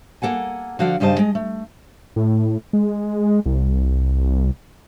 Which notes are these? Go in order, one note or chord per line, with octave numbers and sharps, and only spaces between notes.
A#3 A4 F#5 G#5
D3 F3 F#4 A4 D5 F5
G2 C#3 G3 C5 D#5 A5
G#3 D#5
A3
A2
G#3
C2